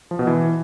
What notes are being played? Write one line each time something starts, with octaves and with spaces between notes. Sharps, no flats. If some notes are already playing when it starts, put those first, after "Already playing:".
F3
B2
E3